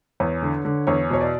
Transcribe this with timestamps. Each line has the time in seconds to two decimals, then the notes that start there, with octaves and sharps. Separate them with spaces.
0.20 E2 C#5
0.42 D3
0.65 D3
0.87 E2 C#5
1.10 B2 C#5
1.21 D5